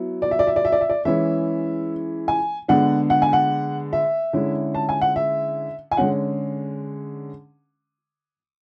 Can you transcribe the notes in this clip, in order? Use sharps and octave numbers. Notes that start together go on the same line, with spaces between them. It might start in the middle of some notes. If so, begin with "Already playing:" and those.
Already playing: F#3 B3 E4
D5
E5
D5
E5
D5
E5
D5
E5
D5
E3 G#3 C#4 E4 E5
G#5
D3 G#3 B3 D4 F#5
F#5
G#5
F#5
E5
D3 G#3 C#4 E4
A5
G#5
F#5
E5
G#5
D3 G#3 C#4 F#5